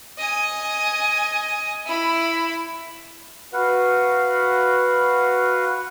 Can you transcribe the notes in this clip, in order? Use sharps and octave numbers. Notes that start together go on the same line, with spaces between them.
D#5 G#5
E4 B5
F#4 B4 F5 F#5